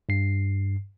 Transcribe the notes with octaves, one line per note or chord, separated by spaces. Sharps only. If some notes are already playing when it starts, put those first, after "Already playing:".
G2 C7